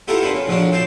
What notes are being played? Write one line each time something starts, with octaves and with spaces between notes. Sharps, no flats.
B3 E4 F4 G4 A4 A#4
A#3 D4 F#4 B4 C5
C#4
A#1 B2 F3 C#4 D4 D5
C4 F4 C5 A5 C6